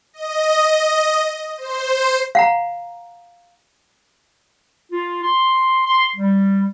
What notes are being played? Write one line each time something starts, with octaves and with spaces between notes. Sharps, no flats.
D#5
C5
F5 F#5 A#5
F4
C6
C6
G3